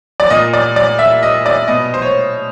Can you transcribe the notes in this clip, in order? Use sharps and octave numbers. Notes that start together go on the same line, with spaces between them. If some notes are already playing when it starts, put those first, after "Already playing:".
D5
A#2 D#5
D5
D5
E5
D#5
D5
B2 D#5
C5
C#5